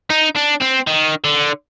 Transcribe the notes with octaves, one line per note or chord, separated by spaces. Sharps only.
D#4
D4
C4
D#3
D3